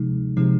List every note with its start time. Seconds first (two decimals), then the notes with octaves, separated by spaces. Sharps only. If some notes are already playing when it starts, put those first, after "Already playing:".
Already playing: C3 F3 G#3 D#4
0.37 C3 F3 G#3 D#4